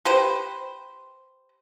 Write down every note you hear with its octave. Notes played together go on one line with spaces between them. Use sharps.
G4 B4 C5